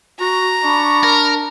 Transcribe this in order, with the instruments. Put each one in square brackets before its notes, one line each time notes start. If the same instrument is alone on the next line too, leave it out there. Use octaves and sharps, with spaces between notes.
[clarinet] F#4 [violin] A#5
[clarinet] D4 [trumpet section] D5 B5 C#6
[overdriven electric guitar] A#4